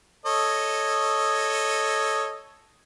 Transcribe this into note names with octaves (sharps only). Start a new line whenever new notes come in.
A4 C#5 D#5